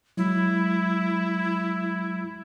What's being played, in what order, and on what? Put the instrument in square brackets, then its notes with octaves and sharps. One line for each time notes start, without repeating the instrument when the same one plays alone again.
[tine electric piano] F#3 G#3 [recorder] E4